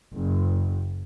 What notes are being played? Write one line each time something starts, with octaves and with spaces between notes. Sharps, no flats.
F#1